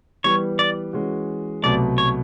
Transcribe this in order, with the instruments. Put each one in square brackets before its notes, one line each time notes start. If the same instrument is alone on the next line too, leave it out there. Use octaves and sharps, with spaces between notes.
[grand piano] E3 G3 B3 [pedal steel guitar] C#5
[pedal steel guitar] D5
[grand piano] E3 G#3 C#4 F#4
[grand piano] C2 B2 F#3 A3 [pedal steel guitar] D5
[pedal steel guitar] C#5